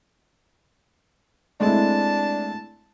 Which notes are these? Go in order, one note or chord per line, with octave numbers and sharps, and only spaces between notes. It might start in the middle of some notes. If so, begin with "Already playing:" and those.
G#3 A3 C4 D4 E4 A5